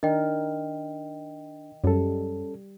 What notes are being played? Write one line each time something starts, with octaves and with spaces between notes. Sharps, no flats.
D#3 D4 A#4 D#5 G5
F#2 G3 C#4 A4